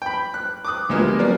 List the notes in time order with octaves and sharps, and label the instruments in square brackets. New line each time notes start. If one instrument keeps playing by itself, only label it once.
[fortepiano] G5 B5
F#6
D6 D#6 F#6
D2 F3 G3 G#3 A#3 B3
F#3 A#3 B3 A#4 D5